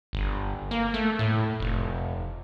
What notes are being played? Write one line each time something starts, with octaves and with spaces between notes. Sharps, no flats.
G1
A#3
A3
A2
F1